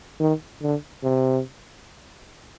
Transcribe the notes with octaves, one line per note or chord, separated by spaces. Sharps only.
D#3
D3
C3